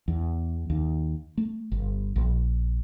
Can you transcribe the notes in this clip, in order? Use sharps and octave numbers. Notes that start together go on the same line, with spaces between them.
E2
D#2
A3
G1
A#1